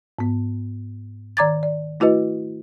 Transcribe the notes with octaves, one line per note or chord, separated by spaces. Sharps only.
G#2 B3
D#3 D5 A#5 D6 G#6 A6
D5
A3 E4 F#4 B4 D#5